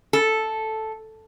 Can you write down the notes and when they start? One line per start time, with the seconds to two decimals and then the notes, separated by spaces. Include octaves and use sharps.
0.13 A4